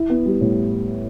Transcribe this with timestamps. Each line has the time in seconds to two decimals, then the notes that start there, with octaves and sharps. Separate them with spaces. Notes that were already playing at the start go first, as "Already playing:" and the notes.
Already playing: E4
0.10 B3
0.26 G3
0.41 A2